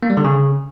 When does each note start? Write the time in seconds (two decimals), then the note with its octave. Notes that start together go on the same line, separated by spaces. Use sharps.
0.03 A#3
0.10 G3
0.17 D3
0.24 C#3